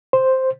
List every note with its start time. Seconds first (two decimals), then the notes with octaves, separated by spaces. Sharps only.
0.13 C5